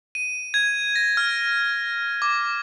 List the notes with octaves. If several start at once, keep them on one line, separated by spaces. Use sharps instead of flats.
D#7
G#6
A#6
F6
D6